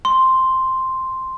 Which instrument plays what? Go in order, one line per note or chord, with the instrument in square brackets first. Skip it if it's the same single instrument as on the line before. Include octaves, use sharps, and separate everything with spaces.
[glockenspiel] C6